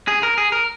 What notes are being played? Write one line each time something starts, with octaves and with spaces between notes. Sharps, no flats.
G#4
A#4
G#4
A#4